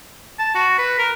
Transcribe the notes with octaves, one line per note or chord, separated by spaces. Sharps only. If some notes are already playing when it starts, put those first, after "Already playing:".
A5
F#4
B4
A#4